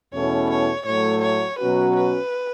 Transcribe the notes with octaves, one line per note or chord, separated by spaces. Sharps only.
E2 B2 A3 C#4 E4 C#5
C#5
A2 F#3 A3 C#5
C#5
B2 F#3 C#4 F#4 B4
B4